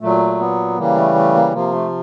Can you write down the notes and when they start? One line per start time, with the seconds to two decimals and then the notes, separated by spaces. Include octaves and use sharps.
0.01 A#2 F#3 A3
0.39 B3
0.77 C#3 E3 G3 A#3
0.96 A3
1.15 A3
1.34 A#3
1.53 C3 F3 A#3
1.72 A3